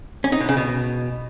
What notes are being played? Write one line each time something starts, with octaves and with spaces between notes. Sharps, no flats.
C#4
D#4
B2
C#3
B2